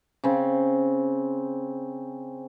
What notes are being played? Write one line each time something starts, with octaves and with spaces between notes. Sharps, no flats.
C#3 C4